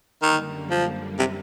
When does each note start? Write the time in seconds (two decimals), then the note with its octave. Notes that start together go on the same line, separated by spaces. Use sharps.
0.22 F#2 D3 D#3 G3 A#3
0.71 F3
1.19 C3